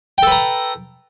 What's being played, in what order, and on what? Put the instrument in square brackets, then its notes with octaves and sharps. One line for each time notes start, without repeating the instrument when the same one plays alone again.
[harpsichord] G5
A4
B4
A#5